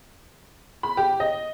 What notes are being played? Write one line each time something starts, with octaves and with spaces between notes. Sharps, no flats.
B5
G4
D#5